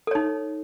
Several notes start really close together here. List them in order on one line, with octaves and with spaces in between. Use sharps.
A4 C#5 D#4